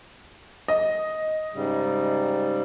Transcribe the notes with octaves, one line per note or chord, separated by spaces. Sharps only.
D#5
G#2 C#3 G3